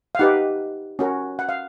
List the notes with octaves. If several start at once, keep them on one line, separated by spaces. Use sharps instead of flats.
F5
D#4 G4 B4 F#5
C#4 F#4 A#4
F#5
F5